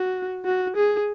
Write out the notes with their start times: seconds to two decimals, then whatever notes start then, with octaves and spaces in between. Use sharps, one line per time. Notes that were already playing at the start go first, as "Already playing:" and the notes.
Already playing: F#4
0.45 F#4
0.76 G#4